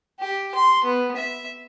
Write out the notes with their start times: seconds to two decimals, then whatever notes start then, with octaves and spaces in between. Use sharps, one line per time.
0.20 G4
0.55 C6
0.84 B3
1.17 E5